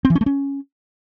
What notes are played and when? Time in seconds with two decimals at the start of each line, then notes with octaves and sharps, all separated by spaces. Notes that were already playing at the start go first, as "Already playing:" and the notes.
0.05 C4
0.10 E3
0.15 C#4
0.21 A3
0.26 C#4